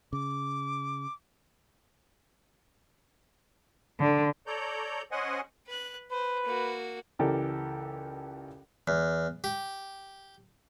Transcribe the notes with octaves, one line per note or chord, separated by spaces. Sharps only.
C#3 D6
D3
A4 C#5 D5 A#5 G6
C#4 C5 D#5 F#5 G#5
B4 F#6
B4 C5
A#3 F#4
C#2 E3 G4 A4 A#4 D5
E2
G4